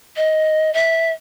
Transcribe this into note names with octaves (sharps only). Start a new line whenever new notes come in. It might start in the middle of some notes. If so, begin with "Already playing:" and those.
D#5
E5